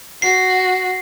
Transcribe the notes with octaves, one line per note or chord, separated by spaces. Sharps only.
F#4 C7